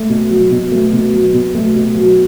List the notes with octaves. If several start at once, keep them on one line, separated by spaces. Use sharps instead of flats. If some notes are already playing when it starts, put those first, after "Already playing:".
Already playing: A3
B2
F#3
B2
A3
B2
F#3
B2
A3
B2
F#3